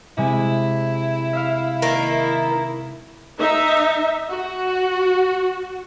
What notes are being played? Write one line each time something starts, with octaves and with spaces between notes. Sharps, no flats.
C3 G#3 E4 G#5
E5 F5 F6
D#3 A#3
D#4 E5
F#4